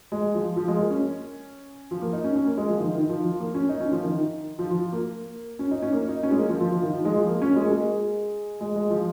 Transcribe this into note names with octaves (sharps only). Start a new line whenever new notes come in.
G#3
F3
F3
G#3
A#3
C#4
F3
A#3
D#4
C#4
C#4
A#3
G#3
F3
D#3
D#3
F3
F3
A#3
C#4
D#4
C#4
F3
D#3
D#3
F3
F3
A#3
C#4
D#4
C#4
A#3
D#4
C#4
G#3
A#3
F3
F3
F3
D#3
F3
G#3
F3
A#3
C#4
G#3
A#3
G#3
G#3
G#3
F3